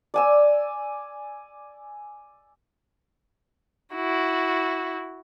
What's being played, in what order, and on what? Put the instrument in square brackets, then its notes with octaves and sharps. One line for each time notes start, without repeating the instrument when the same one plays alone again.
[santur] D5 G#5 E6
[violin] E4 F#4